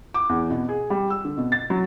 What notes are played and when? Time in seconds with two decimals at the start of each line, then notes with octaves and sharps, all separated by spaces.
0.14 D6
0.29 E2
0.50 B2
0.69 G#4
0.90 G3
1.10 E6
1.25 D3
1.38 B2
1.52 A6
1.70 F#3